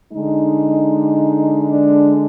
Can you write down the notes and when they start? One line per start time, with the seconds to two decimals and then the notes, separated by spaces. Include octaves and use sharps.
0.11 D3 G#3 D#4
1.70 D4